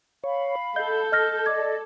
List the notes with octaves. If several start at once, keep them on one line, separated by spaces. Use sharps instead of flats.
C#5 F5 B5
A4 D#5 G6
D#5 F6 A#6
D5 D#5 D6 G#6